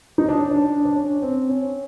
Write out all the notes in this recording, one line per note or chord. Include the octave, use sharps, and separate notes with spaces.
D#4
D4
C#4
D4
D4
C#4
C4
C#4